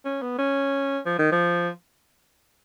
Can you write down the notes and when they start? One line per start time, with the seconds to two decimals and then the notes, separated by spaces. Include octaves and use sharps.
0.05 C#4
0.22 B3
0.39 C#4
1.06 F3
1.19 D#3
1.32 F3